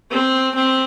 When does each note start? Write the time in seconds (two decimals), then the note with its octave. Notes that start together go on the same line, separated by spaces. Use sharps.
0.10 C4
0.55 C4